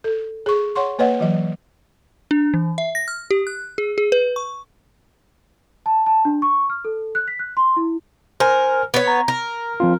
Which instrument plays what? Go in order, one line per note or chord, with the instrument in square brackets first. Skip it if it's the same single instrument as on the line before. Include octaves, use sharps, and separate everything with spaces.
[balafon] A4
G#4 C#6
C#5 F#5 C6 C#6
A#3 B4 C#5 D#5 F#5
E3 F#3 D#5
[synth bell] D4
E3
E5
A#6
F6
G4
F#6
G#4
G#4
B4
C#6
[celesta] A5
A5
D4
C#6
F6
A4
F#6
B6
F#6
C6
E4
[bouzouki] A#4 [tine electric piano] C5 G#5
[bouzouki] B3 C#5
[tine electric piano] A#5
[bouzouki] A#4
[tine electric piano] F3 C4 F4